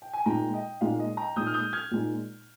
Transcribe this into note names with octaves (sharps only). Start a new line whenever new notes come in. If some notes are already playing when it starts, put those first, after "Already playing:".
G5
G#5
A#2 G#3 D#4 G5 A#5
D#5 G5
A#2 G#3 D#4 F5
D#5
G5 A#5
A#2 G#3 D#4 D#6 G6
F6
D#6 G6
F6 G#6
A#2 G#3 D#4